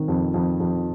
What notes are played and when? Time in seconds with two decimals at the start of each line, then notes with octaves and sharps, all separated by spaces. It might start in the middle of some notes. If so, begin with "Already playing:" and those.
Already playing: D#3 C4
0.08 F2
0.34 F2
0.60 F2